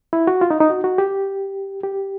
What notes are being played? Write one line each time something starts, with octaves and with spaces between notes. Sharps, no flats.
E4
F#4
F4
D#4
D#4
F#4
F#4
G4
G4